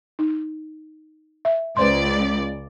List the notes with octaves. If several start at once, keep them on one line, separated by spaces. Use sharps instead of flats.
D#4
E5
C#2 B4 C5 D5 C6